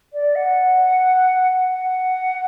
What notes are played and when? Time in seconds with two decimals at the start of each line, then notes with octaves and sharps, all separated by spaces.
0.13 D5
0.35 F#5
1.69 F#5